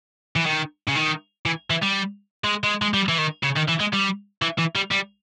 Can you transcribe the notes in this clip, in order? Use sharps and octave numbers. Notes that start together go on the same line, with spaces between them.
E3
D#3
C#3
D#3
E3
E3
G3
G#3
G#3
G#3
G3
E3
D#3
C#3
D#3
E3
G#3
G3
E3
E3
G3
G3